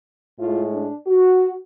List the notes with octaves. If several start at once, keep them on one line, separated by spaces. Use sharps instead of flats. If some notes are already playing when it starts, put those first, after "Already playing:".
A2 G#3 F4
D4
F#4